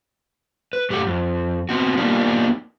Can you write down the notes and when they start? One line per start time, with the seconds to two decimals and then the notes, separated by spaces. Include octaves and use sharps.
0.73 B4
0.90 A2 G4 A4 E5 F#5
1.07 F2
1.69 B3 C4 F#4
1.98 A#3 B3 D4 D#4 F4 G4